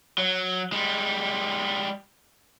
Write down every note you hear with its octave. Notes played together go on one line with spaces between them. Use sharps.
F#3
G3 G#3